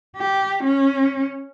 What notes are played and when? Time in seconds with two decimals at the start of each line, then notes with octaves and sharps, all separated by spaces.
0.16 G4
0.64 C#4